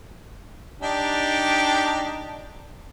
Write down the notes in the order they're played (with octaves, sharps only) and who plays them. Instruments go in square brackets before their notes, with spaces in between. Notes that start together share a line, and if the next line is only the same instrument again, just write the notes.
[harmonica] D4 D#4 G4